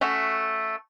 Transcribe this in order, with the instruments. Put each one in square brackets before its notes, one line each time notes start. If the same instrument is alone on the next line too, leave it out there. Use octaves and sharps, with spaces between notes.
[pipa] A3 C#4 F#4 E5